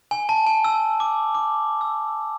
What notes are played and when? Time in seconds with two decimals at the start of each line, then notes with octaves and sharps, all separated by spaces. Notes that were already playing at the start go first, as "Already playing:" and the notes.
0.11 G#5
0.29 A5
0.47 G#5
0.64 E6
1.00 D6
1.35 D6
1.81 E6